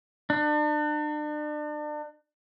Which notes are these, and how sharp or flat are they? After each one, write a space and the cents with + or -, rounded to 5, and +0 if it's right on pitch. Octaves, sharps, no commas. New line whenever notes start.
D4 +35